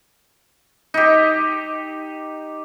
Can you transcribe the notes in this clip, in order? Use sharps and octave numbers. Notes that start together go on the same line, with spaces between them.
D#4 G4